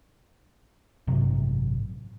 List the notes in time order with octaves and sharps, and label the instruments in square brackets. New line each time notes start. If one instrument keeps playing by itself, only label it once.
[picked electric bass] A1 G2 C3 F#3